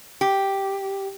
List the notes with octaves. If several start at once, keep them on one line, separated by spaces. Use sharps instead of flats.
G4